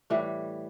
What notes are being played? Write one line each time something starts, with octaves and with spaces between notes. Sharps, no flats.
A2 E3 G3